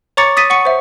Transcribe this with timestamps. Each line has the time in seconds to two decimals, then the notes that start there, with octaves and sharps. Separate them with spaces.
0.17 C#5 A#5 C#6 D6 A6 C#7
0.37 D#6 A6 B6 D#7
0.50 F#5 C#6 C#7
0.65 C5 E5